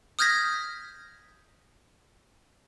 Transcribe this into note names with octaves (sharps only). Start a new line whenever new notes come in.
D#6 F6 G6 G#6 A#6 B6